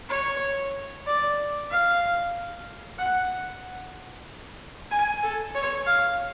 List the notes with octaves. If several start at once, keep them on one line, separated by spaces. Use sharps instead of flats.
C#5
D5
F5
F#5
G#5
A4
C#5
F5